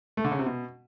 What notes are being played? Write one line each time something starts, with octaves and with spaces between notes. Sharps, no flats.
A3
D3
C#3
C3
B2